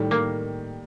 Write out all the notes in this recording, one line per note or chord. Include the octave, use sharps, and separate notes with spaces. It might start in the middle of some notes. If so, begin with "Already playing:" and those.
Already playing: A2 D#3 G3
A#3